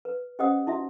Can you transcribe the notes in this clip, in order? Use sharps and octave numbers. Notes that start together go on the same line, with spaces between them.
B4
C#4 G4 C5 D#5 F#5 D#6
D#4 E4 F#4 E5